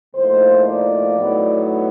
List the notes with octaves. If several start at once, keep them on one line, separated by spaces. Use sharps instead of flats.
A2 F3 A#3 D#4 C5
D5
A2 F#3 B3 D#4